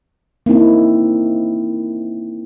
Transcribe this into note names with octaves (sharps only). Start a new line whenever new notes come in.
A#3 C4 D#4 E4